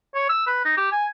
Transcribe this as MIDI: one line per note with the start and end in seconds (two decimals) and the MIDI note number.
0.15 0.28 73
0.29 0.45 88
0.47 0.62 71
0.65 0.73 63
0.77 0.89 67
0.92 1.06 80